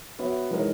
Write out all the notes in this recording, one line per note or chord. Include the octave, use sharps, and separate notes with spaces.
B3 F#4 C#5 E5
E3 G#3 D#4 A#4 C#5